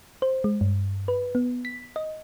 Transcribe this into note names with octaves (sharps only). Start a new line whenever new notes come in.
C5
G#3
G2
B4
B3
B6
D#5